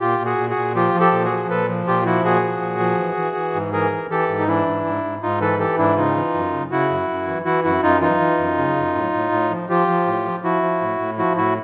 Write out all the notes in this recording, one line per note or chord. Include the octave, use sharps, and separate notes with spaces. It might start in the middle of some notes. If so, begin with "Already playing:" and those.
A#2 F4 G4
A#2
F#4 G#4
A#2
F#4 G#4
A#2
F3 F4 G4
F3
G4 A4
A#2
F#4 G#4
F3
A#2 A4 B4
F3
A#2 F4 G4
F3 E4 F#4
A#2 F#4 G#4
F3
A#2
F3
E3
E3
E3
G#2
E3 G#4 A#4
E3
E3 G4 A4
G#2
D#4
E3 D4 E4
G#2
G#2
G#2
G#2 D#4 F4
E3 A4 B4
E3 G4 A4
G#2 D4 E4
C#3 D#4 F4
E3
F#2
C#3
C#3 E4 F#4
F#2
F#2
E3
E3 E4 F#4
F#2 E4 F#4
F#2 D#4 F4
E3 D#4 F4
E3
F#2
C#3
F#2
A2
A2
A2
F3
F3 F4 G4
F3
A2
F3
F3 E4 F#4
F3
A2
A2
F3 E4 F#4
A2 E4 F#4